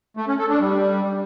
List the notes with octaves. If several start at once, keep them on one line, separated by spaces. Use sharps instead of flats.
A3
C#4
A4
D4
G3